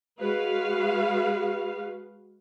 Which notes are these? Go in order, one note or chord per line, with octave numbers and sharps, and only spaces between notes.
G#3 F#4 B4 F5